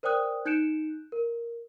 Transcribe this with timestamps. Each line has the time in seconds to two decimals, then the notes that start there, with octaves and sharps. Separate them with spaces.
0.03 A#4 C5 D5 G5 D#6 F#6
0.45 D#4 F#6 G6 C#7 D7 E7
1.12 A#4